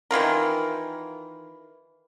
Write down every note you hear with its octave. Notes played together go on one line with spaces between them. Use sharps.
D#3 E3 F4 A#4